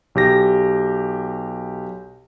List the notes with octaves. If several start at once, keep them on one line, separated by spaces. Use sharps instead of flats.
B1 G4 A#6